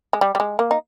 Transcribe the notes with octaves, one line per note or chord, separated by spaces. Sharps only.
G#3
G3
G3
G#3
A#3
D#4